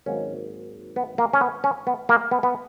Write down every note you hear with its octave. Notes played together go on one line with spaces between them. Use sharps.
G#1 G#2 D#3 F#3 A#3 C#4
B3
A#3
C#4
B3
C#4
B3
A#3
B3
B3